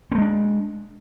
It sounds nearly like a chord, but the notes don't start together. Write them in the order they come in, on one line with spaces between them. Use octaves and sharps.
C4 A3 G#3 D4